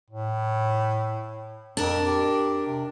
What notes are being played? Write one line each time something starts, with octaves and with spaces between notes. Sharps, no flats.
A2
F2 D4 A#4
G4
C3